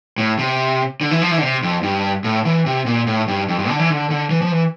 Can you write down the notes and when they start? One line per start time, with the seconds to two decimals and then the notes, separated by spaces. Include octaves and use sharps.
0.18 A2
0.39 C3
1.01 D3
1.11 E3
1.22 F3
1.31 E3
1.38 D3
1.42 C3
1.63 F2
1.83 G2
2.24 A2
2.45 E3
2.66 C3
2.86 A#2
3.07 A2
3.28 G2
3.49 F2
3.59 G2
3.69 D3
3.79 E3
3.90 D3
4.10 D3
4.31 E3
4.42 F3
4.52 E3